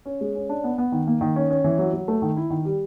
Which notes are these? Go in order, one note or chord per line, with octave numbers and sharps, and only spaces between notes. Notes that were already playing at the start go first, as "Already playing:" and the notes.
C#4
G#3
C#4
D4
B3
B3
D#3
A#3
D#3
C#4
C#4
E3
F#3
F#3
A3
D#3
E4
D#3
G3